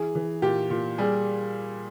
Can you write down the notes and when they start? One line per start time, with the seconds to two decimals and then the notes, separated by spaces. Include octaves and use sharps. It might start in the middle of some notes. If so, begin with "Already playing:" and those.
Already playing: E3 G#4
0.15 E3
0.42 A#2 G4
0.70 A#2
0.98 G3 G#4